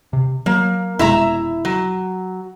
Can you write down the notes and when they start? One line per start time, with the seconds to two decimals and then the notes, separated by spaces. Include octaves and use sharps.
0.13 C3
0.46 F#3 A#3
0.99 F1 B2 G#3 E4 E5 A#5
1.65 F#3